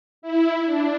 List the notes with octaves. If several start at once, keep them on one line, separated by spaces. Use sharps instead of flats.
E4
D4